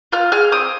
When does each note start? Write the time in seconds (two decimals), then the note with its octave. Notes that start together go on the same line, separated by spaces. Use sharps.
0.12 F4 F6
0.32 G#4 F6
0.52 C4 D#6